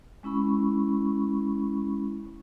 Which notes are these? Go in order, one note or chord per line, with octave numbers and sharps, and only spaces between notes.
G#3 C#4 E4 B5 C#6